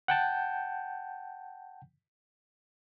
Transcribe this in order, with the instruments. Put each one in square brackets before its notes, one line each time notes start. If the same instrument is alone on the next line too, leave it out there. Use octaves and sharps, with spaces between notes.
[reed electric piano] F#5 G5 A5 G6